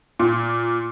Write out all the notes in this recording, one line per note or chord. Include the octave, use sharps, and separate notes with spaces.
A#2